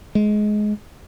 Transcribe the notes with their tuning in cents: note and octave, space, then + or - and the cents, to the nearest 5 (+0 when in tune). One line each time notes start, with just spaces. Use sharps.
G#3 +20